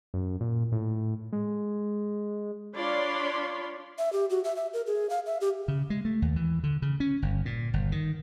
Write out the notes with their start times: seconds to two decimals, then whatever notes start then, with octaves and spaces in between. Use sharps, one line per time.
0.14 F#2
0.41 A#2
0.72 A2
1.33 G#3
2.76 D4 F4 C#5 D5 B5 C6
3.98 E5
4.13 G4
4.30 F#4
4.44 E5
4.56 E5
4.74 A#4
4.86 G#4
5.10 F5
5.26 E5
5.41 G4
5.68 C#3
5.90 G#3
6.05 A3
6.22 D#2
6.36 E3
6.64 D3
6.82 C#3
7.00 C#4
7.22 G1
7.45 A#2
7.74 G1
7.92 D#3